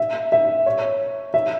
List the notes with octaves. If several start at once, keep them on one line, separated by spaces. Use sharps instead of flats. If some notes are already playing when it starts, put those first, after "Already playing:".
Already playing: E5
E5
C#5
E5